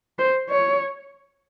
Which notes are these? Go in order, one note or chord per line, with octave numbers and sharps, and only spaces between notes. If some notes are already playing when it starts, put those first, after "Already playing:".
C5
C#5